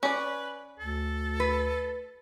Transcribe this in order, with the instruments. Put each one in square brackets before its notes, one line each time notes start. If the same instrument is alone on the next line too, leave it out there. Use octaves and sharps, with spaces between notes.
[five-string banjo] C#4 D5 [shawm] B4
[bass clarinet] D2 [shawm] A4
[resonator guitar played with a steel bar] B4